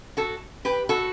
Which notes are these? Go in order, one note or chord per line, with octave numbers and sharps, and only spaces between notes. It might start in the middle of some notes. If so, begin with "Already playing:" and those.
F#4 A4
G4 B4
F#4 A4